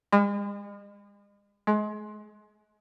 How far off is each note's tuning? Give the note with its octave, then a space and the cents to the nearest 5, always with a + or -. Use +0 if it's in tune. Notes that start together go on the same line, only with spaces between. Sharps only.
G#3 -40
G#3 +30